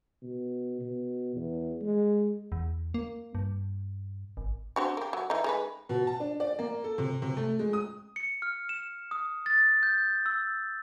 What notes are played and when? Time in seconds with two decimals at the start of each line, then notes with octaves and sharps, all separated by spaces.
0.22 B2
0.81 B2
1.36 E2
1.82 G#3
2.52 E2
2.94 A#3
3.35 G2
4.37 G#1
4.76 C4 D4 F#4
4.97 A#3 G4
5.13 F#3
5.30 E3 D#4
5.44 G#3 D#4 B4
5.89 B2
6.07 A5
6.20 D4
6.40 D5
6.59 A#3
6.84 A4
6.98 C3
7.22 C3
7.37 A3
7.59 G#3
7.73 D#6
8.16 C#7
8.42 F6
8.69 E7
9.11 D#6
9.46 A6
9.83 G6
10.26 E6